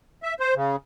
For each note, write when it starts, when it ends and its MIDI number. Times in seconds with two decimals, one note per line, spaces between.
0.23 0.34 76
0.40 0.54 72
0.56 0.76 49